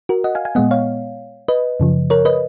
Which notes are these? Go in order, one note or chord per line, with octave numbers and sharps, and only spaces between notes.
F#4 A#4
D#5 F#5
F5 G#5
F5 G#5
A#2 G#3 B3 D#5 F#5
C#5 F5
B4 D#5
F#2 C#3 F3
A#4 C#5
B4 D#5